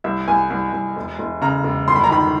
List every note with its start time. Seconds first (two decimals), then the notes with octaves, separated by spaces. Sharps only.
0.04 C2 E5
0.28 C2 G#5
0.50 C2
0.73 C2
0.97 E1
1.19 E1
1.41 C#3 A#5
1.64 E1
1.88 G1 C6
1.96 B5
2.04 A#5
2.10 D#3 B5